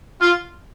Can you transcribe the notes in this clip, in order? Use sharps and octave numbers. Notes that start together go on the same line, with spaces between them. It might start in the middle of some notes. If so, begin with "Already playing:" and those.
F4